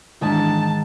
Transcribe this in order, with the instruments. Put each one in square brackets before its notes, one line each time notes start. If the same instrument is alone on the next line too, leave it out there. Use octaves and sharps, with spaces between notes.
[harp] G#2 D#3 [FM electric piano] E3 D4 E4 [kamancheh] A5